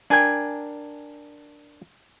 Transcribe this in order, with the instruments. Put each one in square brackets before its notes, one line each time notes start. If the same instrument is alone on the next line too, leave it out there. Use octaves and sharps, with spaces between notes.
[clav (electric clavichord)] D4 A#4 G5 [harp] G#5 G#6